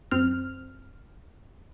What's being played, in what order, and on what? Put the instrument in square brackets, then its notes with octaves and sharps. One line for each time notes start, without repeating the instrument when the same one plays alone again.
[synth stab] F#2 C4 F6